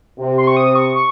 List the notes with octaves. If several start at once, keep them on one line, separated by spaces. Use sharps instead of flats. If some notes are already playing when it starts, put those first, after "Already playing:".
C3
C6
C#6
D#6
C#6
C#6